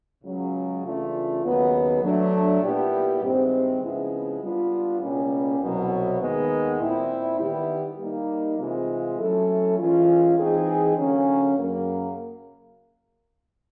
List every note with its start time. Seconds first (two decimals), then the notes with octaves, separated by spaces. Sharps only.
0.24 C#2 C#3 F#3
0.84 C#3 E3 A3 D4 F4
1.44 D#2 C#3 F#3 B3
2.03 F#3 A3 D4
2.62 A#2 G3 B3 E4 G4
3.22 G2 D#3 G#3 C4 E4
3.82 C#3 F3 G#3 B3 E4
4.42 G3 B3 D4 F4
5.01 C#2 B2 G3 A#3 C#4
5.61 C2 B2 F#3
6.21 D#2 D#3 G#3 B3
6.80 A#2 G3 C4 E4
7.40 D#3 G3 B3 E4 G4
7.99 G3 A#3 D#4
8.59 C3 E3 G#3 C4 F4
9.18 F#3 A3 C#4 E4 A4
9.78 E3 G#3 C#4 F4
10.37 E3 G#3 C4 D#4 G#4
10.97 D3 F#3 A#3 C#4
11.56 F#2 C#3 F#3 A#3